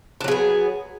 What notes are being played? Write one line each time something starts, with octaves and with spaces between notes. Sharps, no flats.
F#3 B3 D4 G#4